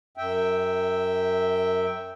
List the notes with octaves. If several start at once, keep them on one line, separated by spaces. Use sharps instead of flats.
F#2 E5 G5